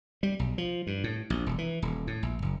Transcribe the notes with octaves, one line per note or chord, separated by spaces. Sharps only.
G3
B1
F3
G2
A2
A#1
E1
E3
D#1
A2
A#1
F#1